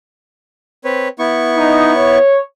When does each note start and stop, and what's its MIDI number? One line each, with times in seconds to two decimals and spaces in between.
0.84 1.08 60
0.84 1.08 71
0.84 1.08 73
1.19 2.18 59
1.19 2.18 64
1.19 2.18 85
1.57 1.92 63
1.96 2.39 73